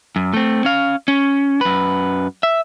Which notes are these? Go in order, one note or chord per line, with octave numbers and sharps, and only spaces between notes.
F#2
A3 C4
C#4 F5
C#4
F#2 B4
E5